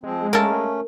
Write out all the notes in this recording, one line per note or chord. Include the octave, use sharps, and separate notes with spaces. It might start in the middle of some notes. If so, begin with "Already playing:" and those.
F3 G#3 C4
A3 A#3 C#4 A4 A#4